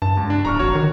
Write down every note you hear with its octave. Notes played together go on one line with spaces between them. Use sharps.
G2 A5
C#2
D4
D1 A#5 C#6 F6
G#1 F#4 C#5
D#3